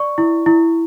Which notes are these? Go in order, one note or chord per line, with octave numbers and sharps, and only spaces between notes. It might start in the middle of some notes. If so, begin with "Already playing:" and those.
Already playing: D5 C#6
E4
E4